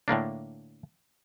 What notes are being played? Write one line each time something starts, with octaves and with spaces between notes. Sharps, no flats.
A2 D3 A#3 D4